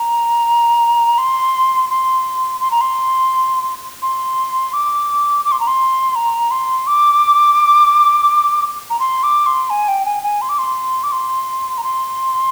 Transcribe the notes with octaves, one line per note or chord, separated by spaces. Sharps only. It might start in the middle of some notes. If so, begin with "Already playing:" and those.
Already playing: A#5
C6
C6
C6
A#5
C6
C6
D6
D6
C6
A#5
C6
A#5
C6
D6
A#5
C6
D6
C6
G#5
G5
G#5
G#5
C6
D6
C6
D6
C6
A#5
C6